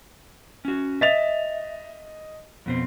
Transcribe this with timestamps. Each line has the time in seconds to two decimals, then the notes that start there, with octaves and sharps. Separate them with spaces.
0.65 C#4 F#4
1.01 D#5 E5 A6 F7
2.66 F2 B2 C4